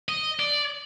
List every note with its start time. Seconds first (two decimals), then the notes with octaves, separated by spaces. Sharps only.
0.09 D#5
0.39 D5